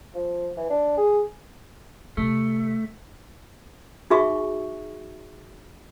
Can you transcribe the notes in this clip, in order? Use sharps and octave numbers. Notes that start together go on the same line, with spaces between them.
F3
E3
D4
G#4
C3 A3 E4
D#4 F#4 G#4 E5 G#5 C#6